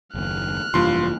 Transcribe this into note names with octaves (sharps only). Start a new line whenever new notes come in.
F#1 D#2 F6 F#6
F1 G2 E3 A#3 F4 C6